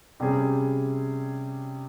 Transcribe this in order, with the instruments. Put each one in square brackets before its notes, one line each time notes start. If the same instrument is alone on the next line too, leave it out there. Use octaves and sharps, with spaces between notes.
[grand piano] C3 G3 C#4 G#4